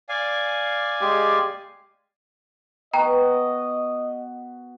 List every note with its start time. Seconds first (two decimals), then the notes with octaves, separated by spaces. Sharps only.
0.09 D5 F5 G#5
1.01 G#3 G4
2.94 B3 F#4 D#5 G5 A#5